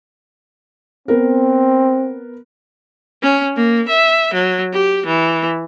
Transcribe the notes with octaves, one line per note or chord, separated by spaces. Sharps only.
B3 C4 A#4
C#4
A#3
E5
F#3
G4
E3